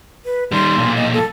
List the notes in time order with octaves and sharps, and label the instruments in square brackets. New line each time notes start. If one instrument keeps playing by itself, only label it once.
[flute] B4
[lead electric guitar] D#3 G3 [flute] C6
[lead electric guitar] B1 A#2
[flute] D#5
A4